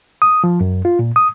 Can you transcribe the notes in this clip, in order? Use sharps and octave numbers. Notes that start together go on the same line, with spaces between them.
D#6
F3
F#2
F4
A#2
D#6